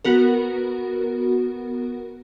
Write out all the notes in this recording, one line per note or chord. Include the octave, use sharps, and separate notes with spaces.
B3 F#4 A#4